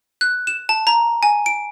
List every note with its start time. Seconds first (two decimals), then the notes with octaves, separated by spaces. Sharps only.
0.21 F#6
0.47 E7
0.69 A5
0.87 A#5
1.23 G#5
1.46 D7